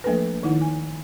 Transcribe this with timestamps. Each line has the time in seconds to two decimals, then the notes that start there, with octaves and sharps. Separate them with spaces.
0.04 F3 A3 A#3 D4 A4 B4
0.43 D#3 D#4 E4 F#5
0.61 G#5